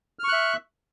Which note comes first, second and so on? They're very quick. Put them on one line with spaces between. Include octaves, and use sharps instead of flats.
F6 C#6 F#6 E5